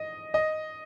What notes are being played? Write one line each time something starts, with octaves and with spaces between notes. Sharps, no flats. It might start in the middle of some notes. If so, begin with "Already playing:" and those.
Already playing: D#5
D#5